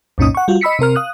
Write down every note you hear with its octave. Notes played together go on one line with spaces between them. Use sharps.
C2 F#2 A#2 C#4 D#4 D#6
F#5 C#6
G3 F4 F#4
D#5 B5 E6 B6 C#7
C3 C4 A#4 F6
F5 D#6 F#6